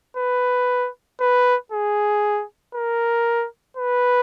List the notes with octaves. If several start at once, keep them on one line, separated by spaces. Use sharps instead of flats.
B4
B4
G#4
A#4
B4